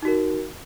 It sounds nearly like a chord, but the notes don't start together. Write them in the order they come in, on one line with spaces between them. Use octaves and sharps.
D#4 F#4 A#4